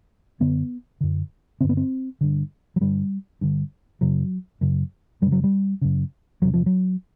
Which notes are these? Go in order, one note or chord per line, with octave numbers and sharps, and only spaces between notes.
F#2 D3 B3
F#2 D3
G2 D3 C4
B3
C4
G2 D3
F#3
G2 D3 G3
G2 D3
F#2 C#3 F#3
F#2 C#3
F#2 C#3 G3
F#3
G3
F#2 C#3
E2 C3 F#3
F3
F#3